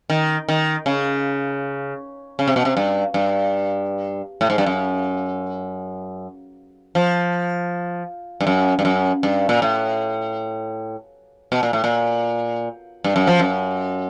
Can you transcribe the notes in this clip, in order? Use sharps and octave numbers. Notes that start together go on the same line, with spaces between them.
D#3
D#3
C#3
C#3
C3
B2
C3
G2
G2
A2
G#2
G2
F#2
F3
G2
F#2
G2
F#2
G2
A#2
A2
B2
A#2
A2
A#2
G2
F#2
F3
F#2